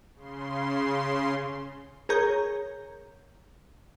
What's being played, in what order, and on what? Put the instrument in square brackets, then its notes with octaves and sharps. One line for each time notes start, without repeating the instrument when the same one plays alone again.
[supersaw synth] C#3 C6
[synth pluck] G#4 A#4 C#5 A#5 G6